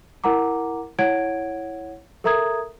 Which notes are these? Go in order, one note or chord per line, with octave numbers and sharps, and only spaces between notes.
E4 A#4 F#5 A#5 D6
E4 C#5 F#5 G#6 D7
A4 A#4 E5 A#5 D#6 G#6